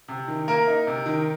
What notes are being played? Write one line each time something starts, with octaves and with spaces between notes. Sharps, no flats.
C3
D#3
A#3 A#4
D#4
C3
D#3